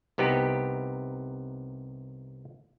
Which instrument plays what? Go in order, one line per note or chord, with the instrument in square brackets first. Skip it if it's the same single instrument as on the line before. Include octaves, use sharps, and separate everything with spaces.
[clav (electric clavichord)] C2 C3 B3 D#4 G4